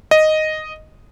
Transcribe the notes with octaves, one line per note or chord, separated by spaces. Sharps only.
D#5